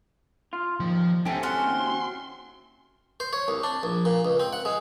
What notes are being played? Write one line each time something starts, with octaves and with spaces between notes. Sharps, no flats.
F4
D#2 A#2 F3
C#2 C3 A3 D4 C5 G5 G#5
C#4 E4 F#4 C6
D#2 C4
C5
C#5
C2
D4
A#1
A#2
C#2
C4
F#5
G#3